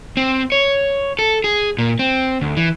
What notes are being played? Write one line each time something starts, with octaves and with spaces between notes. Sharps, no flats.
C4
C#5
A4
G#4
A#2
C4
D2
E3